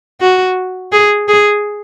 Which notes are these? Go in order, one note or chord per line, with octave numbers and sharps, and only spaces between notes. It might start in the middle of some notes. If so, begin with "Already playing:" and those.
F#4
G#4
G#4